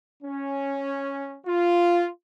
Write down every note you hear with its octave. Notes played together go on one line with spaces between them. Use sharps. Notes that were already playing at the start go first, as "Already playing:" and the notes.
C#4
F4